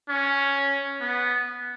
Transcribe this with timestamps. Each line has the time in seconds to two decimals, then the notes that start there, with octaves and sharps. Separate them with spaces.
0.09 C#4
1.01 B3